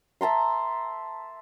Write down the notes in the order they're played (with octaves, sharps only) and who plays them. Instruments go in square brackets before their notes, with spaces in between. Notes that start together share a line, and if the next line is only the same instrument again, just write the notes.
[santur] E5 A5 A#5 C6